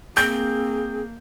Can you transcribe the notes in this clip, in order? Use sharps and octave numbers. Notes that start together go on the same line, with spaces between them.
A#3 C4 G#4 G6